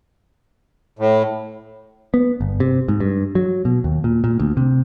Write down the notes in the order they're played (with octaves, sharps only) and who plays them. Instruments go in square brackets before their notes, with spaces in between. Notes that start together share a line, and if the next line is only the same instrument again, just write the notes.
[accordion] A2
[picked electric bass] B3
G1
C3
G#2
G2
F#3
B2
D#2
A#2
A#2
D2
C3